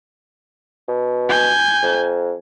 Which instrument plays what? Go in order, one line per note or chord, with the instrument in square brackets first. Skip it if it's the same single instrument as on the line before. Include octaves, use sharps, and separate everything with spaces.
[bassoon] B2
[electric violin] G#5 G6
[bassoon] F2